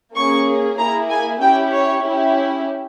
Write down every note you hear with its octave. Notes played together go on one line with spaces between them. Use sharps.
A#3 C#4 G#4 C#6
A#3 E4 G#4 A#5
G#5
C#4 E4 G4 G5
C#5
C#4 E4 G4